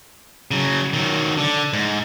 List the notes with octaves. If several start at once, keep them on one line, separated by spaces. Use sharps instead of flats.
C#3 F#3
D#3 F#3
D3
G#2